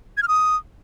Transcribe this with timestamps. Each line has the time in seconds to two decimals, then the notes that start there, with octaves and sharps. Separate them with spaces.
0.17 G#6
0.23 F6
0.28 D#6